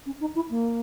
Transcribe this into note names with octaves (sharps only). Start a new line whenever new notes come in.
C#4
D#4
E4
A#3